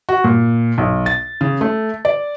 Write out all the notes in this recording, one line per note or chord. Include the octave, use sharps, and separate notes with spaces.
F#4
A#2
B1
A6
C#3
A3
D5